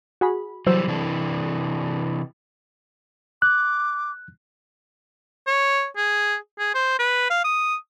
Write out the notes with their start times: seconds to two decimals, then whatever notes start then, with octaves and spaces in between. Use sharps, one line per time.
0.21 F#4 G#4 B5
0.67 E3 F#3 G3 C5 E6
0.87 C3 E3 D4
3.42 D6 F#6
5.47 C#5
5.97 G#4
6.59 G#4
6.74 C5
6.99 B4
7.30 F5
7.44 D#6